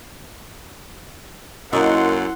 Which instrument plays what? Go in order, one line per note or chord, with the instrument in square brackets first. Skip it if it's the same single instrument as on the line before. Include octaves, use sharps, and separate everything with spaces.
[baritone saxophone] F#2 [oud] A#3 D#4 [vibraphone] E4 [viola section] F#5 C6